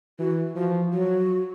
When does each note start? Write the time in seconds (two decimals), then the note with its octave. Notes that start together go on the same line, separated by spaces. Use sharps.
0.19 E3 F#4
0.56 F3 F#4
0.93 F#3 F#4